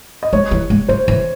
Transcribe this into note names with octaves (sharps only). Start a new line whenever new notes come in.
D#5
G#3 C#5
E3
G#3
G#3 C5
E3